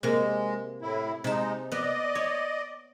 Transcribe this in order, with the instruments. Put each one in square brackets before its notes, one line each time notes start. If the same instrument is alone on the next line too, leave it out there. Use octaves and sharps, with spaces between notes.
[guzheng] C3 A#3 [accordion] G#3
[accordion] A2 E4
[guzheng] C3 A5 [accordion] G#3 D#4
[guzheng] B3 [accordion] D5 D#5
[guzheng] C#5